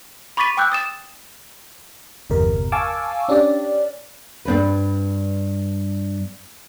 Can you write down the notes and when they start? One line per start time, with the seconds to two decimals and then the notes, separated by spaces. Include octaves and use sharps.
0.37 B5 C#6 D6 A6 B6 D#7
0.57 G5 D6 E6 F#6 G6
0.72 D#6 A6 E7
2.30 G1 E2 C3 A#4
2.72 F5 G#5 A5 C#6 D6 E6
3.29 C#4 D4 G4 D5
4.45 G2 C4 D4 B4